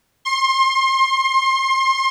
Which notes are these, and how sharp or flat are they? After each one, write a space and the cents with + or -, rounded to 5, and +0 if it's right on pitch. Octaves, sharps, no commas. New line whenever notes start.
C6 +30